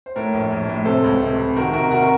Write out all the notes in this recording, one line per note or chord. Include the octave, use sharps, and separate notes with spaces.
C5
A2 A#4 C#5
A#1
A#1
A2
C3 A4 C5
C#2
C3
C3
D#3 F#4 A#4
C3 F#4 A#4
C3 F#4 A#4
A#4